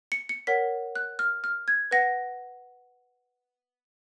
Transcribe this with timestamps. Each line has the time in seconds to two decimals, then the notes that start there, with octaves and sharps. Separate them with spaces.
0.12 C#7
0.29 C#7
0.47 A#4 C#5 F#5 B6
0.95 F#6
1.19 F6
1.44 F6
1.68 G#6
1.91 B4 F#5 A#6